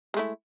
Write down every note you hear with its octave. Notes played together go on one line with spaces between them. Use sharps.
G#3 A3 E4